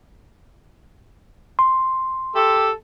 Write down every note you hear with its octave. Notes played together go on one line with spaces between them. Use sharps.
C6
G4 A4